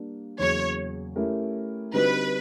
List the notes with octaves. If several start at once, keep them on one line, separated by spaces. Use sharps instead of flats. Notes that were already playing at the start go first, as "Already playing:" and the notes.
Already playing: G3 A#3 D4
E2 C#3 F#3 A#3 C#5
A3 C#4 E4 G4 A#4
D3 G3 C4 D#4 F#4 B4